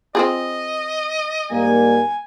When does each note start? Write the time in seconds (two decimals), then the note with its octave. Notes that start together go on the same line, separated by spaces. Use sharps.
0.15 C4 F4 G#4 D#5
1.50 G#2 G3 A#3 G#5